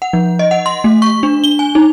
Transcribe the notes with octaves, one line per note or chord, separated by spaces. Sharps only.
F#5
F3
D#5
F#5
C6
A3
C#6
D4
G7
G#5
D#4